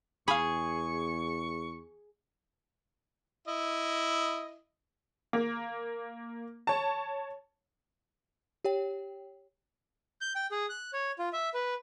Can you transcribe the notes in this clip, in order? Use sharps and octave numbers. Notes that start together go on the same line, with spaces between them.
E2 G#4 F5 B5 C#6
E4 D#5
A#3
C#5 A5
G4 C#5 G5
G6
G5
G#4
F#6
C#5
F4
E5
B4